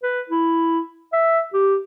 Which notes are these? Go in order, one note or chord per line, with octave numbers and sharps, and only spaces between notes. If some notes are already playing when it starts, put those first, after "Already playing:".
B4
E4
E5
G4